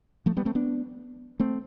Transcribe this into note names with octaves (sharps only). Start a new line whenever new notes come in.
F3 A3
G3 B3
A3 C4
B3 D4
A3 C4